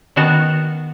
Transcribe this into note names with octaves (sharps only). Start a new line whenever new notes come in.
D#3 B3 F#4 A5 A#5